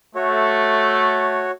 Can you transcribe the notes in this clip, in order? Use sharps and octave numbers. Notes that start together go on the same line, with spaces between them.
A3 F#4 C#5